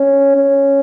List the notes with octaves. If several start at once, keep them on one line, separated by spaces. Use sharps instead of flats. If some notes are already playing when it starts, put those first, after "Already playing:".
Already playing: C#4
C#4